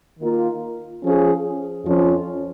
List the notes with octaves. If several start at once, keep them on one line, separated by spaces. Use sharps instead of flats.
D#3 A#3 F4 A#4
F3 C#4 G#4
F2 F3 C#4 F4